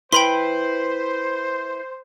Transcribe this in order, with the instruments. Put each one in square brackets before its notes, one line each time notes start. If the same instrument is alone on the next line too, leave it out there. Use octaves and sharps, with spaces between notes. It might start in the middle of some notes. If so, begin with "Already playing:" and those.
[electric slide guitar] E4 B4 [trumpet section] C5 [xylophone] G5 B5 C6